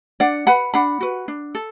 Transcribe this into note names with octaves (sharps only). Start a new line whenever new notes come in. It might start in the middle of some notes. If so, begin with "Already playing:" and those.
D4 D5 F#5
B4 F#5 B5
D4 F#5 B5
F#4 B4
D4
A4